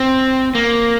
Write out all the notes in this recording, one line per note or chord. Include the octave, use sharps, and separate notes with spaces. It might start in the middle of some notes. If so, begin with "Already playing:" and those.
Already playing: C4
A#3